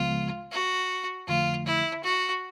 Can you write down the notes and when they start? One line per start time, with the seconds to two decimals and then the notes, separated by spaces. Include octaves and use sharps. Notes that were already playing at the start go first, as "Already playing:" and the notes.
Already playing: C#2 C#3 F3 G#3 B3 F4
0.51 F#4
1.27 F2 D3 F3 A3 F4
1.66 E4
2.03 F#4